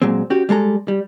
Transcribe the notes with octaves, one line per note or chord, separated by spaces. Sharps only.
A#2 F#3 G#3 C4
C#4 F#4 G4
G3 G#3 A4 A#5
G3